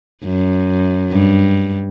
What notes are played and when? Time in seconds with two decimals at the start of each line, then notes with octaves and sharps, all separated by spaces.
0.25 F#2
1.12 G2